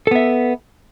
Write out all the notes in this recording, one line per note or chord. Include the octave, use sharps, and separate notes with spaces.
B3 A4 E5